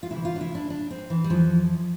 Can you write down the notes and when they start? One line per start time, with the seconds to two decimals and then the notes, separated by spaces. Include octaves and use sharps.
0.03 F4
0.10 D2 C3 E3 E4
0.25 F4
0.36 D4
0.41 E4
0.55 D4
0.70 D4
0.91 C4
1.10 E3
1.24 G3
1.30 F2 E3 F3